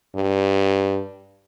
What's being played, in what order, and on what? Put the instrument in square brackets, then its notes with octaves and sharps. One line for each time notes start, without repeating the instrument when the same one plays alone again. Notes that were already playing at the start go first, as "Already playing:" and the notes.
[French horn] G2